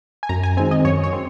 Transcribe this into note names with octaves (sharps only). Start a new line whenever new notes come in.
G#5
F#2 A#5
G#5
D#3 G#3 C4 G#5
D#5
F#2 C#5
C#5
C4